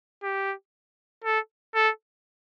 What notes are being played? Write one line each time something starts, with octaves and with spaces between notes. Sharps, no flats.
G4
A4
A4